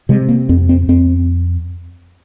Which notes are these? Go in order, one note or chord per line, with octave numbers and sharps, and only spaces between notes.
C3 G#3
A#3
F2 C4
C4
F2 C4